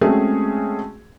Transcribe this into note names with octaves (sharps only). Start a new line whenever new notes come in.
G#3 A3 C4 C#4 F#4 G#4